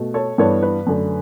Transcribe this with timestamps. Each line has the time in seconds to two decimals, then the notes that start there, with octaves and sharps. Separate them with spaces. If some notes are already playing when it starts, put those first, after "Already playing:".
Already playing: B2 A3
0.14 A4 C#5
0.38 G2 E3 G3 B3 A4 C#5
0.63 B4
0.87 F#2 D3 A3